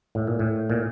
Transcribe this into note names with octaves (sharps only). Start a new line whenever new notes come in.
A2
A#2
A2
A#2